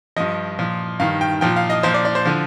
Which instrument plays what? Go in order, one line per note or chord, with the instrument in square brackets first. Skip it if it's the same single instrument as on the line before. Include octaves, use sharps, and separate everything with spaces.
[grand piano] G2 F3 D#5
A#2 F3
G2 D#3 F5
G5
A#2 F3 G5
F5
D#5
A#2 F3 C5
D5
D5
C5
D3 F3